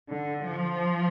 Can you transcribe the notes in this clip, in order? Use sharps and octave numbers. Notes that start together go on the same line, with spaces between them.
D3
F3